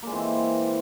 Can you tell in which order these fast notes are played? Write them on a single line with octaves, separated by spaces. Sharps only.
A#3 G#3 E3 C4